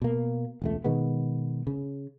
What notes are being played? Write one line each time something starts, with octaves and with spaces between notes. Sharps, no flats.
B2 A#3
E1 C#2 A3
B2 D#3 G#3 B3
C#3